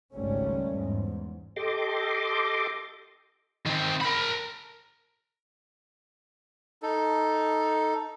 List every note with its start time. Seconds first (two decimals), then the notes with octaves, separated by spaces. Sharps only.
0.14 G#1 C#2 G#2 G3 A3 C#4
0.68 E2 G#2
1.56 G4 A4 D#5 C6 D6
3.66 D#3 C4
4.01 A#4 B5
6.82 D#4 A4